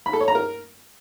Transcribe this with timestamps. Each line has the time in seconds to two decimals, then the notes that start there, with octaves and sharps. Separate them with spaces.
0.06 B5
0.13 A4
0.21 C#5
0.28 A#5
0.35 A#4